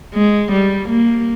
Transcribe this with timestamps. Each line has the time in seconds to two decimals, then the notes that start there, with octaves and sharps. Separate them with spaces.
0.14 G#3
0.52 G3
0.89 A#3